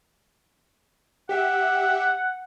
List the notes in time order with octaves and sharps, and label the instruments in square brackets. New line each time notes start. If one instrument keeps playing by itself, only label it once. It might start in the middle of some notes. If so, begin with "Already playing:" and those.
[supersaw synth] G4 E5 [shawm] F#5